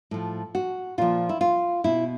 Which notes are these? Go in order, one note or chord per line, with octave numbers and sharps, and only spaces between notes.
A2 F3
F#4
A#2 F3 F4
E4
F4
B2 E4